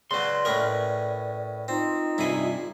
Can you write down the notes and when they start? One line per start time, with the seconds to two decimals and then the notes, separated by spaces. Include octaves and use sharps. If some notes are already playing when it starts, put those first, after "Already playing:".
0.11 C#3 F#3 B4 D5 C6
0.45 A2 C#4 A#4 B4 D#5
1.68 C4 D#4 F4
2.18 G2 C3 E4 G#4 B5